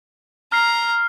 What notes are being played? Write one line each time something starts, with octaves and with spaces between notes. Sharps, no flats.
A#5 F6 C7